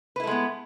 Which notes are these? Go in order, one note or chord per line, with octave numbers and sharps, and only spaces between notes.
G#3 A3 B3 E4 B4